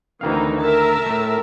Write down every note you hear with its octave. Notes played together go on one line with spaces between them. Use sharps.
D2 D#3 E3 C4 D#4 F5
A#4 E5 A5
A2 A3